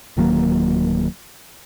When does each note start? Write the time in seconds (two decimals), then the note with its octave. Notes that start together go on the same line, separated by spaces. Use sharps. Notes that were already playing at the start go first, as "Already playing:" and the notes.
0.17 D1 D#3 F#3 A#3